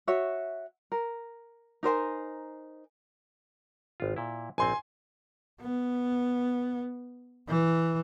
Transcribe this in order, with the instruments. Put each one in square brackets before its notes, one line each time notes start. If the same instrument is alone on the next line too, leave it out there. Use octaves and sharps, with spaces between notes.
[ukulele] F#4 C#5 E5
A#4
D#4 A#4 C5 G#5
[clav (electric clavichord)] G#1 F4
A#2 E4
[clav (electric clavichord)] A#1 C4 [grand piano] G#5 C6
[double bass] B3
E3